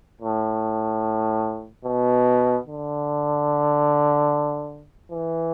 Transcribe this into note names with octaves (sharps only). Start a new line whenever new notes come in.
A2
B2
D3
E3